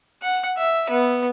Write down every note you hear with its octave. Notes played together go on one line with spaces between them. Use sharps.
F#5
E5
B3